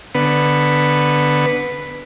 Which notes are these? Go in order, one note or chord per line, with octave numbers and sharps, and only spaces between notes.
D3 B3 B4